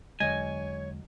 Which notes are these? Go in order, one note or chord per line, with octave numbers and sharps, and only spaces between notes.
E2 D3 F#3 G#3 C#5 D#5 G#5